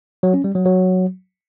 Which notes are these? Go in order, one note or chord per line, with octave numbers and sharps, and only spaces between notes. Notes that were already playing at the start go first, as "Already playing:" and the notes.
F#3
C#4
G3
F#3
F#3